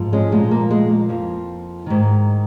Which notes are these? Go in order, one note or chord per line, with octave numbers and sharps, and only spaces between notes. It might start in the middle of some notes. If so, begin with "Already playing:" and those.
Already playing: G#2 F3
G#3 C#4
A#2 F3 G#3
A#3
G#3
A#3
F2 F3
G#2 D#3